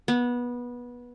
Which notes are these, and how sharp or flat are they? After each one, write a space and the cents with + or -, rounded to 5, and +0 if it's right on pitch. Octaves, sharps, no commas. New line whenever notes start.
B3 -20